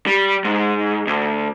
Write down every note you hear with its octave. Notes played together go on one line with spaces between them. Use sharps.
G3
G#2
D2